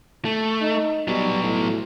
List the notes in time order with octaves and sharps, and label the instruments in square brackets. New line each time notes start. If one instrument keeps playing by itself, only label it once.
[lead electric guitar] A3
[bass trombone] D#4
[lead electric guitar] F#3 B3 [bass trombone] G3
[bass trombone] A2